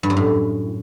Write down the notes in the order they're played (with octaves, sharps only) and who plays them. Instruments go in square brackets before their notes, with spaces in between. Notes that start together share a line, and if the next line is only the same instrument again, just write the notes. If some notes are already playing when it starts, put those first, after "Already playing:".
[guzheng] G2
F#2
A2